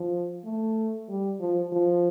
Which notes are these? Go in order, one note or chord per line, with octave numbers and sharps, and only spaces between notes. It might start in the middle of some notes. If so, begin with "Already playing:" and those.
Already playing: F3
A3
G3
F3
F3